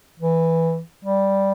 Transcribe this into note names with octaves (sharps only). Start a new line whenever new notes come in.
E3
G3